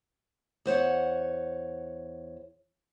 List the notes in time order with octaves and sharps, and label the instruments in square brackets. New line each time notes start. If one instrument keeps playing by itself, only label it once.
[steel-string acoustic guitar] E2 C5 C#5 F#5